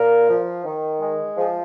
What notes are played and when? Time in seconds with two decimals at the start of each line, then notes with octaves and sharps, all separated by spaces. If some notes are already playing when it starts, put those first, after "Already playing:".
Already playing: A#2 A#4
0.28 F3
0.65 D#3
1.01 G#3
1.37 F3 G#4